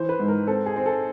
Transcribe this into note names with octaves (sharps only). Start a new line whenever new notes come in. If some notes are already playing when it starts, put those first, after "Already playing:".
Already playing: E3 C5
B4
G#2
A#4
C4 A4
G#4
C4
A4